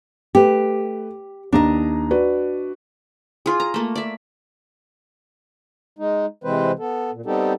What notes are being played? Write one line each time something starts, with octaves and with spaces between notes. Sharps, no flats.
A3 G4 B4
D#2 D4 D#5 A#5
F#4 B4 D5
F4 G#4
A#5
A3 A#3
D5 E5
G#3 D#4
C3 E3 G#3 C4 B4 C5
B3 A4
A#2
G3 B3 C4 D#4 G4 A4